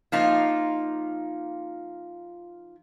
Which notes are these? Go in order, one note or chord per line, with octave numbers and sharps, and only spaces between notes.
F3 A#3 D#4 F4